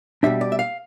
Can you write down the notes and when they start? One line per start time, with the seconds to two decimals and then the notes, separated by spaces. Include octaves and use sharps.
0.23 B2 G3 D4 E5
0.41 D5
0.52 E5
0.59 F5